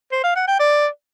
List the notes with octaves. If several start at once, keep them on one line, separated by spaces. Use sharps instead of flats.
C5
F5
F#5
G5
D5